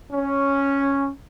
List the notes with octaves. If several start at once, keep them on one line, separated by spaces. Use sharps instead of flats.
C#4